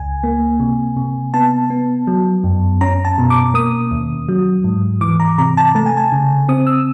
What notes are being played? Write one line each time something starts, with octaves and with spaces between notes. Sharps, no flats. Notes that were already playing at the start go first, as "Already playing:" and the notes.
Already playing: C#2 G#5
A#3
C3
C3
B3 A5
B3
F#3
F#2
C#4 A#5
A5
B2
D6
A#3 D#6
D#2
F#3
G#2
E3 D6
A#5
C3 A#5
A5
A3 A5
G#5
A5
C#3
C4 D#6
E6